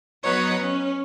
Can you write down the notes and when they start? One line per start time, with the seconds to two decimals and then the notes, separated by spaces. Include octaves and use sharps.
0.22 F#3 B3 D#4 B4 C#5 D#5
0.58 C#4